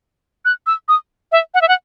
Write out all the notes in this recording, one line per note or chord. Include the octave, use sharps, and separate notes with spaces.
F#6
E6
D#6
E5
F#5
E5
F#5